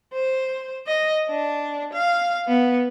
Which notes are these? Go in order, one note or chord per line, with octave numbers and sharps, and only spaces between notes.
C5
D#5
D4
F5
B3